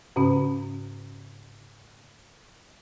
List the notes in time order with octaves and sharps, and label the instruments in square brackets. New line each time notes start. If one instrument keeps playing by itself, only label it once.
[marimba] G#2 C#3 C#4